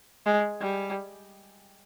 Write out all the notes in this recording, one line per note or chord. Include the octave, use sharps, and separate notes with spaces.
G#3
G3